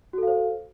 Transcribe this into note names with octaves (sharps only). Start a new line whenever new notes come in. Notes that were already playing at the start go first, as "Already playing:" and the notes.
F#4 A4 C5 F5